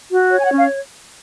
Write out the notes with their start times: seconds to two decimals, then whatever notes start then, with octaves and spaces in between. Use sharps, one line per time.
0.10 F#4
0.30 C#5
0.39 G#5
0.44 F#5
0.51 C#4
0.57 F5